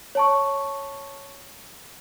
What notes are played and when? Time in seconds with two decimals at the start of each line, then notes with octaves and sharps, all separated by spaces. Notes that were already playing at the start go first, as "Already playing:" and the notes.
0.15 C#5 A5 C#6